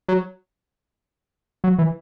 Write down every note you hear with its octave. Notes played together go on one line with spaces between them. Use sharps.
F#3
F#3
E3